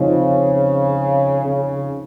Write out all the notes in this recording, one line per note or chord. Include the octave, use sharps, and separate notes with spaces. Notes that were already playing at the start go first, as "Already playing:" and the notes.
Already playing: C#3 F3 C4 D#4
C#3